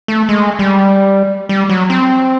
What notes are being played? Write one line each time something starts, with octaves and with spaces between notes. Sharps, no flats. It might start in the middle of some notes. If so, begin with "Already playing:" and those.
A3
G#3
G3
G3
F#3
C4